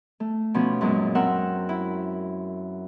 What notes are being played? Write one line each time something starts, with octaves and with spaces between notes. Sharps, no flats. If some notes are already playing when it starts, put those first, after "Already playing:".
A3
B2 F3 C#4
F#2 A#2 G#3
C4 A#4 F#5 E6
E4